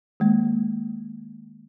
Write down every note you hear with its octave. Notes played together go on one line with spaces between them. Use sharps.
D#3 G#3 A#3